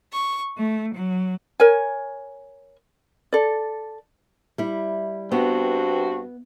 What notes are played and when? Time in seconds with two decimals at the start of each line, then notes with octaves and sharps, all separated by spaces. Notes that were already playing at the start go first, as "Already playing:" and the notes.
0.12 C#6
0.56 A3
0.93 F#3
1.60 A#4 C#5 G#5
3.33 A4 D5
4.58 G3 E4
5.32 G2 B3 C4 F#4